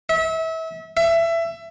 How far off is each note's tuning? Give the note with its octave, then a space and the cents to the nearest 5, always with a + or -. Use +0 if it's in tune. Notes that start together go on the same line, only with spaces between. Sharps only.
E5 -30
E5 +20